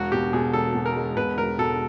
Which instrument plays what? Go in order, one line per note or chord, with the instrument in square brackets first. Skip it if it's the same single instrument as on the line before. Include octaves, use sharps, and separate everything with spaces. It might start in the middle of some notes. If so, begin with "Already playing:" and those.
Already playing: [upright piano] E1 [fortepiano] F#4
[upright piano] B2 [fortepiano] G4
[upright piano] B2 [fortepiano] G#4
[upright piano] E1 [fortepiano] A4
[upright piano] B2
[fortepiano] A#4
[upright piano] G#3
[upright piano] B2 [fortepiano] B4
[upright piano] E1 [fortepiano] A#4
[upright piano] B2 [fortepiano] A4